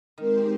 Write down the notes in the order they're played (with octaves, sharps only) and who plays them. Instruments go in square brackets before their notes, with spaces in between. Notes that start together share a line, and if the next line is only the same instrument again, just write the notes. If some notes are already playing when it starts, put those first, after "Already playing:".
[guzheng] D#3 [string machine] G#3 C4 D#4 G4 C5